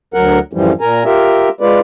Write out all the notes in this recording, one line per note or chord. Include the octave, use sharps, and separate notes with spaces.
D2 F#3 A#4 F#5
F#2 A2 E3 F3 G3
A#2 A#4 G#5 A#5
F4 G4 A#4 E5
G#3 F4 B4 D5